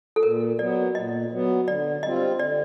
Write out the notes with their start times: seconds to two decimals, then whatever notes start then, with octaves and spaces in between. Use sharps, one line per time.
0.16 A4
0.23 A#2 A#4
0.59 F#3 B3 D5
0.95 A#2 D#5
1.31 F#3 B3
1.68 D3 D5
2.03 G3 C4 F4 D#5
2.39 D3 D5